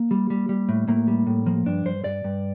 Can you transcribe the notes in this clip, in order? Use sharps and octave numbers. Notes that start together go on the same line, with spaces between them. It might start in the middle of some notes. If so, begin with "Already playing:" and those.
Already playing: A#3
G3
G3
G3
A2
A2 A#3
G3
A2
F3 A#3
G2 D4
G2 C5
G2 D5
G2